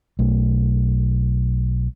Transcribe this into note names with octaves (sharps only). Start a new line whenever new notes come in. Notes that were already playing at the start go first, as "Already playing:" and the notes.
B1 A3